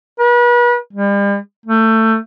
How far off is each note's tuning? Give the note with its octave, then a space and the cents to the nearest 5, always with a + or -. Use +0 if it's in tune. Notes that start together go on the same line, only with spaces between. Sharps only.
B4 -40
G3 +40
A3 +20